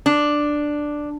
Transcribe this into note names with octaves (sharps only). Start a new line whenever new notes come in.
D4